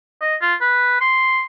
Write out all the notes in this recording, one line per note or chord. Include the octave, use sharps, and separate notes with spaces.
D#5
F4
B4
C6